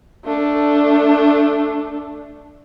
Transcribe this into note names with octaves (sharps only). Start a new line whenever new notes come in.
A3 D4